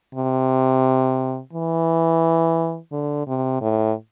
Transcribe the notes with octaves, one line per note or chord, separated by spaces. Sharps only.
C3
E3
D3
C3
A2